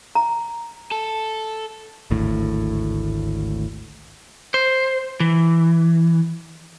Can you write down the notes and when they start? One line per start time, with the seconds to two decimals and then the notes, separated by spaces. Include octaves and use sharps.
0.15 A#5
0.91 A4
2.11 G#1 D2 A2
4.54 C5
5.20 E3